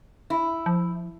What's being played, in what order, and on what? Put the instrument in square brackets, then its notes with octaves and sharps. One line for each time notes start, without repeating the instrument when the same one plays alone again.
[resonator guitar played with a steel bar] E4
[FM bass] F3